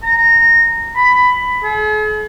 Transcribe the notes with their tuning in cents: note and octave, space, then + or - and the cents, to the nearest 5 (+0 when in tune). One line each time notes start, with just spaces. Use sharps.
A#5 -15
B5 +10
G#4 +45